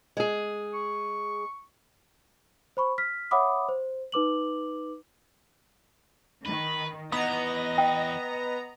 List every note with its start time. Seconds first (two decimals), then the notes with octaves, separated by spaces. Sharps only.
0.17 G#3 G#4
0.73 C#6
2.77 C5 B5 C#6
2.98 F6 B6
3.31 C#5 E5 F#5 B5 D6 D#6
3.69 C5
4.12 D#4 B4 D6 F#7
6.45 D#3 B4
7.12 E2 B3 D#5 A#5 D#6
7.78 G5